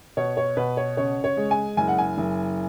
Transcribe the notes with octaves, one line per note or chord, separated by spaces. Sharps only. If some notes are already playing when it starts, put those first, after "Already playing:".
B2 C#5
C#5
B2 B4
C#5
C#3 C#5
C#5
G#3
G#5
F#1 G#5
F#5
G#5
F#1